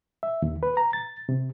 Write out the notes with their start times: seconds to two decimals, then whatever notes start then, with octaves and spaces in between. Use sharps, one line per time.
0.23 E5
0.42 D#2
0.63 B4
0.77 A#5
0.93 A6
1.29 C3